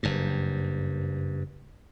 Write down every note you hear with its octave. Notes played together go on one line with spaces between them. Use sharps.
F#1 G2